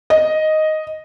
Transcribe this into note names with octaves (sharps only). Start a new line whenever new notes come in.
D#5